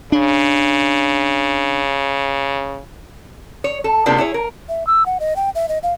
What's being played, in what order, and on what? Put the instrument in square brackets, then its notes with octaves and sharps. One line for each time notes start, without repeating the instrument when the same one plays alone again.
[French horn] C#3 [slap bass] D4
[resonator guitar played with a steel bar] C#5
A4
C3 G#3 A#3 B3 D4 F4
D4 E4 G#4 C#5
A#4
[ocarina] E5
E6
F#5
D#5
G5
E5
D#5
F5